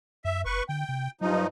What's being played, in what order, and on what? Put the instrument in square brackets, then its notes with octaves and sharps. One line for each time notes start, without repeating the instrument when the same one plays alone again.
[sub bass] F#2 [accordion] E5
[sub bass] F#1 [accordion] B4 C#6
[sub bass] D3 [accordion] G5
[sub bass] C3
[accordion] G2 F3 D#4 [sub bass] F#3